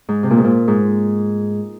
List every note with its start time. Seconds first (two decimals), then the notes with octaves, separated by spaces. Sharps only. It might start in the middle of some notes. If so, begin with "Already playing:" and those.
0.09 G#2
0.23 C3
0.31 A#2
0.38 G#2
0.44 A#2
0.68 G#2